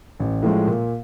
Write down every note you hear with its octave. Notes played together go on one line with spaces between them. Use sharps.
A1
A2 F3 G#3
A#2